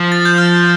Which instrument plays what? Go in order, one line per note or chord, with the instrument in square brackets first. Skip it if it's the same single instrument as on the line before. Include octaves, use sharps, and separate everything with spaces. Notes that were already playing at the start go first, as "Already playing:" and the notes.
Already playing: [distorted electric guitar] F3
[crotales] A6
G6
F6